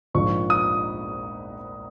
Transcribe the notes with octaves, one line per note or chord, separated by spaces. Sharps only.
A#1 G#2 F3 C#6
D#6